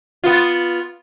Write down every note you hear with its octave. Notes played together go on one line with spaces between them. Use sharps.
B3 F4